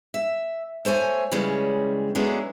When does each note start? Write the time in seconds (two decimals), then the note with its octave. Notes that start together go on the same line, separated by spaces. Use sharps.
0.14 E5
0.85 A3 C5 C#5 G#5
1.31 C#3 E3 G3 G#3 C#4
2.15 F#3 G#3 A3 B3 C#4 D4